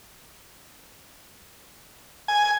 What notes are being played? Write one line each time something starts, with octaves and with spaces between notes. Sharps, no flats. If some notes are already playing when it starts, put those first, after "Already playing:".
G#5